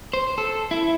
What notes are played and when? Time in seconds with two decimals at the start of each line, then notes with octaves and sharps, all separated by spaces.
0.13 C5
0.38 A4
0.71 E4